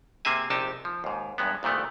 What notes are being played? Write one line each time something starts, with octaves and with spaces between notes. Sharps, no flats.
C3 A#3 C4 G#4 E5 G#5
A#1 C3 D#4 G4 A5
F3
D#2 G#2
E2 G2 G#3 B3
C2 A#2 D#3 A3 B3